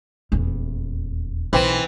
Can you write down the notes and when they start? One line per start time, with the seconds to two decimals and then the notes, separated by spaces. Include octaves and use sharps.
0.32 D#1 E2
1.53 B1 E3 C4